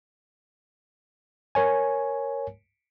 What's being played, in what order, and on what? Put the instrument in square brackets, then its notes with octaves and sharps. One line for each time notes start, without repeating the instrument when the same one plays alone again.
[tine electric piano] A#4 C#5 G#5